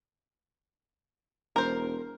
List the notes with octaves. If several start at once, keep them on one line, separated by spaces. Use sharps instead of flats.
E1 A#4 C5